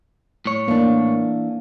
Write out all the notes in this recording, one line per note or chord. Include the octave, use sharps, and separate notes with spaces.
A2 C#5
E3 A#3 D4